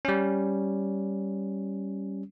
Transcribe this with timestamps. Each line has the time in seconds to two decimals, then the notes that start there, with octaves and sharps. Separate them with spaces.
0.05 G3 C#4